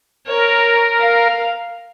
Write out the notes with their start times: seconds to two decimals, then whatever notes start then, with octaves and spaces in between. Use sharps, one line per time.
0.26 A#4 C#5
0.99 F5